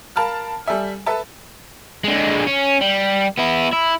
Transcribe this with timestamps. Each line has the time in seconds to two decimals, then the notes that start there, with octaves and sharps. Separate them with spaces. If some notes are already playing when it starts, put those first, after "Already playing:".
0.16 A#4 F5 A5 B5 F6
0.66 G3 A4 E5 G#5
1.06 A4 B4 E5 A5
2.04 D3 G#3
2.47 C#4
2.81 G3
3.38 B3 E4
3.73 E4